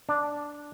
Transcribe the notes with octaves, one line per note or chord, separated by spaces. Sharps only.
D4